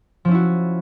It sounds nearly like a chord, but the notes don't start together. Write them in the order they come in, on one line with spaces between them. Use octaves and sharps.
F3 C#4 E4 F#4